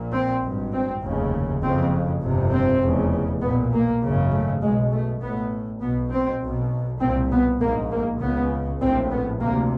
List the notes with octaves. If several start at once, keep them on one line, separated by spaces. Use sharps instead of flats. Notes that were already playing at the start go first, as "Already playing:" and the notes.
Already playing: A#1 A#2
C4
G#1 G2
C4
F1 D#2 C#3
F#1 F2 C#3 C4
G1 F2 C3
C4
F1 E2 C#3
B1 A#2 B3
A#3
G#1 F#2 C#3
A3
B1 B2 G#3
A3
A1 A2 B3
B1 B2 B3
C4
B1 B2
C2 A#2 C4
B3
A#1 G#2 A#3
A#3
C#2 C#3 B3
A#1 A2 C4
B3
D2 C3 A#3